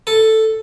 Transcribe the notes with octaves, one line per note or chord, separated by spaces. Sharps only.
A4